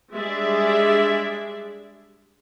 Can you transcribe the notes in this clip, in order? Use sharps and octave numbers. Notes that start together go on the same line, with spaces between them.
G3 G#3 D4 G#4 D5 E5